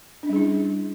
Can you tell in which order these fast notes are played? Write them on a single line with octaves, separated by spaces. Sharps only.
D4 C#4 G3 G#4 E4